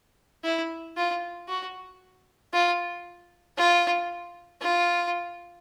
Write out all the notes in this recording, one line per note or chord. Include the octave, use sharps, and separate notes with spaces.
E4
F4
F#4
F4
F4
F4